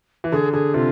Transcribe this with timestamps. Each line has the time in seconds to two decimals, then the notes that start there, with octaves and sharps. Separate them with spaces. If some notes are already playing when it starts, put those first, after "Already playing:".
0.24 E3
0.32 D3 G#4
0.53 D3 G#4
0.74 C3 F4